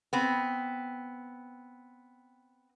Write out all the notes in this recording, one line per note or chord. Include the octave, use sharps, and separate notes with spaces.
B3 C4